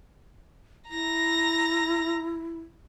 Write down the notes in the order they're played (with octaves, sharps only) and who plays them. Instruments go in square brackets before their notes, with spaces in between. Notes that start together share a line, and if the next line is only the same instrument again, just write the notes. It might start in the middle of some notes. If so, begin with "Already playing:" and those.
[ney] E4 [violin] A#5 A#6